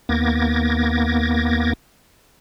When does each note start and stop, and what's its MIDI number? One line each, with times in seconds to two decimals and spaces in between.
0.09 1.73 39
0.09 1.73 58
0.09 1.73 59
0.09 1.73 86
0.09 1.73 92
0.09 1.73 94